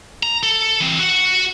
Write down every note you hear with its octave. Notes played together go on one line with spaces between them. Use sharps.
A#5
A4
E3 C4
F#4 F#5